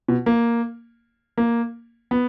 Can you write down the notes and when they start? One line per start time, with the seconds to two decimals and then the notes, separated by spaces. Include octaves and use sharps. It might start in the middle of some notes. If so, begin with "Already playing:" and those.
0.08 B2
0.26 A#3
1.38 A#3
2.11 B3